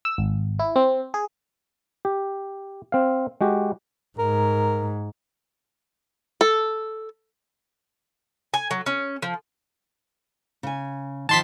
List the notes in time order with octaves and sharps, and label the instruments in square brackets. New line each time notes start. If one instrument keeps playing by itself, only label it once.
[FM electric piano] E6
G#1
E4
C4
G#4
[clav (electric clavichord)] G4
C4 F5
G#3 F#4 G4
[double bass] G#2 [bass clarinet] A#4
[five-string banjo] A4
[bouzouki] G#5
F#3
C#4
F3
[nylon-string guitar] C#3 G#5
[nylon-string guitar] D#3 F3 [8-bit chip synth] A5 C6 B6